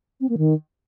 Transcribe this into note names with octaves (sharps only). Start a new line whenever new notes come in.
C4
A#3
D#3